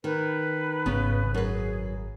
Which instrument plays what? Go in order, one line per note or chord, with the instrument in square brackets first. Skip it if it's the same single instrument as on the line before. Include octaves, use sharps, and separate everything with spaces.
[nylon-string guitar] D#3 [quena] B4
[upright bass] G#1 [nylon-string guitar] C#3 B3
[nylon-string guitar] F#2 B4 [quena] G#4